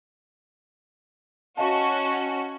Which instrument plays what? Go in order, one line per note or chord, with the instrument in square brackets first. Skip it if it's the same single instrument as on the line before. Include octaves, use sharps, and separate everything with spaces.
[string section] C#4 F#4 [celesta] D#5 F5 A5